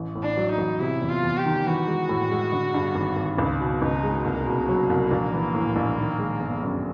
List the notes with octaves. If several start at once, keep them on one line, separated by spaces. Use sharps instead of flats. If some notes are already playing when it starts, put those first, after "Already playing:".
Already playing: A1
A2
D4
F#3
D#4
A1
C3 E4
E2
F4
E2
G4
D#3
E3 F#4
G#3
A2
G#3
D3
G2
G#1
G#1
C#2
B2
C#2 D#4
G#3
C2 A#3
B2
F#3
C2
A#1
E3
A2
A#1
D#3
G#3
G1
F#2